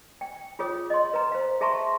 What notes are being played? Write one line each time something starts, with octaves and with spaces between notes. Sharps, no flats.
G5
F4 G#4 C#5 D#6
D#5 C6
B4 A#5
C5 F5
G#4 E5 A5 A#5 C6 C#6